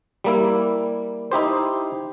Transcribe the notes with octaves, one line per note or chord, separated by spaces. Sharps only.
G3 A#3 E4
D#4 E4 G4 C5